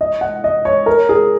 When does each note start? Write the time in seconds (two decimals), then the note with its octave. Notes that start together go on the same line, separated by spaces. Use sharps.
0.01 D#5
0.21 F#5
0.44 D#5
0.65 C#5
0.86 A#4
1.09 G#4